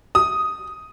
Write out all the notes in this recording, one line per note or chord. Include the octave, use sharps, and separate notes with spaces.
D#6